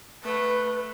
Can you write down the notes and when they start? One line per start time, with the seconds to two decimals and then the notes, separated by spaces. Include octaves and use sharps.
0.24 A3 B4